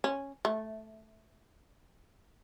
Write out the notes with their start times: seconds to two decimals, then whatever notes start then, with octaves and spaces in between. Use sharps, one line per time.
0.04 C#4
0.45 A3